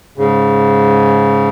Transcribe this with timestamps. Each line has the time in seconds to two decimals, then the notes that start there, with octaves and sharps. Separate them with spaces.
0.18 G#2 C#3